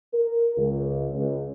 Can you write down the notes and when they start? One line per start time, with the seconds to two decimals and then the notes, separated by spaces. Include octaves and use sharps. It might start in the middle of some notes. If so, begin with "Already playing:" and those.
0.13 A#4
0.57 C#2
1.14 C#2